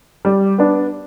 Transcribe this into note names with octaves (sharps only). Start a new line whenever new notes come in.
G3
B3 D4